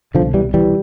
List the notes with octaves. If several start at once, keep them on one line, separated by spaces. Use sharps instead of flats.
C2 B2 D3 F3
E3 G3
E3 G3